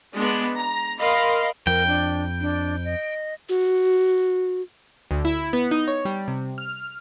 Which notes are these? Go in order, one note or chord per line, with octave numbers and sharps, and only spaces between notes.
G#3 B3 D4
A#5
A#4 D#5 F5 B5 C6
F2 A#4 G5
D4
D4
D#5
F#4
D2
E4
B3
D#4
C#5
G3
C3
F6